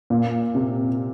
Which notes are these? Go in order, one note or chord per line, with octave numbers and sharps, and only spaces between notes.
A#2
C3